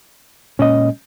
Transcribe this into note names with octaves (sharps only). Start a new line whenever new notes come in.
A#2 G#3 C#4 D#5